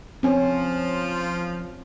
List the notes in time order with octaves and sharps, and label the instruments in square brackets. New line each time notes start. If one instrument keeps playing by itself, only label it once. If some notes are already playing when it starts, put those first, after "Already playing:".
[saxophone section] F3 [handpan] C4 C#4